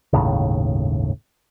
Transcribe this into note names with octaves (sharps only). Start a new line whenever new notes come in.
G1 D#2 A2 C#3